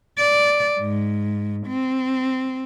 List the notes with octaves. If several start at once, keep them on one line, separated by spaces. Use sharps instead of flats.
D5
G#2
C4